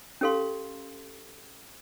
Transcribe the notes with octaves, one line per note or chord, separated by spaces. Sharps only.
C#4 G4 A4 F5 C6